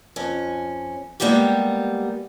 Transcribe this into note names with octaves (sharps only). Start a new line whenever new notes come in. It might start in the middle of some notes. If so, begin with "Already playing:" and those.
F2 C#4
G3 G#3 A#3 B3 G4